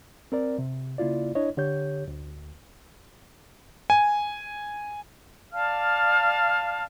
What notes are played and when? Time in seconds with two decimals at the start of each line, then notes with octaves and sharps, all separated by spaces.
0.32 C4 A#4 D5
0.59 C3
0.98 C#3 A#3 E4 F4 D5
1.35 D4 E4 C#5 D#5
1.57 D3 G4 C#5 G6
2.08 D2
3.90 G#5
5.53 D5 F5 A5 F6